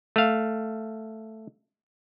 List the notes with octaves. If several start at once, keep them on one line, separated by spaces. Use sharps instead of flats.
A3 F5